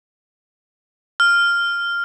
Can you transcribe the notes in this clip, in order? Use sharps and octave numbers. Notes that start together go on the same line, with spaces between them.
F6